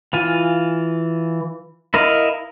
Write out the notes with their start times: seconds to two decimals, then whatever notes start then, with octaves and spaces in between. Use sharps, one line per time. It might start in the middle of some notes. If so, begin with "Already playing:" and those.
0.13 E3 F4 G#5
1.94 E4 A#4 D#5 F5